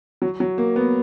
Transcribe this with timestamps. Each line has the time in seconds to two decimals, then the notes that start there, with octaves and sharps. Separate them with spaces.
0.22 F#3
0.40 F#3
0.58 A#3
0.76 B3